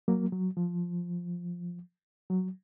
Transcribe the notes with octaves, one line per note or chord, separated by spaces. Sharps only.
F#3 A#3
F#3
F3
F#3